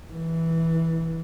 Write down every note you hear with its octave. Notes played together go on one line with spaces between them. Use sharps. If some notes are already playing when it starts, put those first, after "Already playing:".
E3